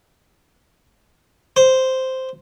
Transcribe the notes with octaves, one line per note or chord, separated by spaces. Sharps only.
C5